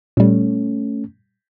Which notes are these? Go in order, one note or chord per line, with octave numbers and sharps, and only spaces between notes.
A#2 G3 A3 C#4